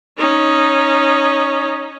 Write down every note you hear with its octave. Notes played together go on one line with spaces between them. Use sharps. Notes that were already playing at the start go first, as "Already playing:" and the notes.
C#4 D#4